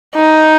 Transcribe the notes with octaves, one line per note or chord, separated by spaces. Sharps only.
D#4